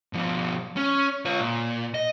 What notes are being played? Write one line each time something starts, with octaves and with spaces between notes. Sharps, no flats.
B2 F3
C#4
F4 C#5
A#2
D#5